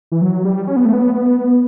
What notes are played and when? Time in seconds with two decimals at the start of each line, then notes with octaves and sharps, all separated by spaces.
0.12 E3
0.22 F#3
0.45 G3
0.67 C#4
0.76 B3
0.85 A3
0.93 B3